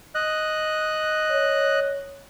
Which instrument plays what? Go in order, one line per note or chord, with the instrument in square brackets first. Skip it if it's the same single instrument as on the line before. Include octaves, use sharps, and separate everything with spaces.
[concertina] D#5 F#6
[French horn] C#5